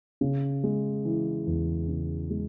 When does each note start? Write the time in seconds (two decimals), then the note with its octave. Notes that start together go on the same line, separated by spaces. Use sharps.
0.21 C#3
0.64 G#3
1.05 E3
1.47 E2
1.88 C#3
2.30 G#3